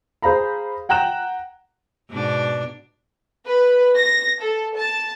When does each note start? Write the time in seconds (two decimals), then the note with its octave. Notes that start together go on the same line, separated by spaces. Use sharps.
0.22 G#4 C5 F5 A#5 B5
0.89 F#5 G5 A#5 F#6 E7
2.10 G#2 B2 D4
3.46 B4
3.95 A#6
4.41 A4
4.76 A5